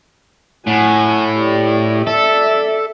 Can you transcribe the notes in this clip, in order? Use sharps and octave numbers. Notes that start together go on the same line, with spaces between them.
A2 F#5 G#5
G4 D5
A4 D5 E5